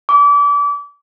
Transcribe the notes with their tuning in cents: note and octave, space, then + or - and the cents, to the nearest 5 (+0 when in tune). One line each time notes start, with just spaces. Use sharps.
D6 -30